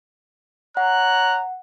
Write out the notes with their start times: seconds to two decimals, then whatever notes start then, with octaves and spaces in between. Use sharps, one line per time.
0.77 C#5 F#5 A#5 F#6